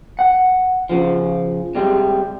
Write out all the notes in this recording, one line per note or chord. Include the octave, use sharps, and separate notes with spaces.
F#5
C#3 F3
C3 G3 G#3